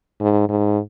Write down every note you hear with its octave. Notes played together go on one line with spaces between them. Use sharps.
G#2
G#2